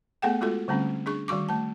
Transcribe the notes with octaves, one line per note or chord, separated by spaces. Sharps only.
A3 B3 G#4 A4 F#5 G5
G#3 F4 F#4 A4
D3 G3 A3 C4 C#4
D4 G#4 C#6
D#3 G3 F#4 C#6 D6
A3 A5